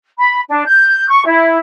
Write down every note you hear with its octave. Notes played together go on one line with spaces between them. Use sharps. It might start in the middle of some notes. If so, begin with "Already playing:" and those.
B5
D4
G6
C#6
E4